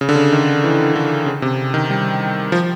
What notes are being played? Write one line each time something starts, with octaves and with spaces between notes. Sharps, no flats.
C#3
D3
C#3
D#3
E3
D3
C#3
C3
D#3
G3
F3